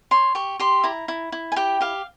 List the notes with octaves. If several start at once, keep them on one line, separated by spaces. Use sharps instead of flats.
C#5 C6
G4 C#6
G4 C6
E4 A#5
E4
E4
G#5
G4 G5
G4 F5